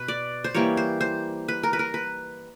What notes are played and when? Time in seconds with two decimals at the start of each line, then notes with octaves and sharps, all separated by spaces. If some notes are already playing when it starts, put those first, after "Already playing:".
Already playing: B2 B4
0.08 D5
0.44 C5
0.54 E3 G3 A#3 C#5
0.77 C5
1.01 C5
1.48 B4
1.63 A#4
1.73 B4
1.79 A#4
1.94 B4